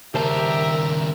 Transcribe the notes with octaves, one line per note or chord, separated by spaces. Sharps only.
D#2 C#3 G3 G4 A#4 C5 E5 A5